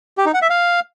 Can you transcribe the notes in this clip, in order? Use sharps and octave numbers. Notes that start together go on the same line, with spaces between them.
G4
D#4
F#5
E5
F5